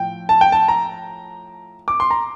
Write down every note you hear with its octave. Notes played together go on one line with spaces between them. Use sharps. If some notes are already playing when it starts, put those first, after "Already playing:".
Already playing: A2 F3 G5
A5
G5
A5
A#5
D6
C6
A#5